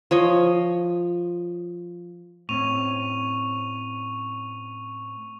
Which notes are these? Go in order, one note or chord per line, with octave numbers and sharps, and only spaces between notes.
F3 C#5 D#5
A2 C4 C#4 C#6 D#7 F7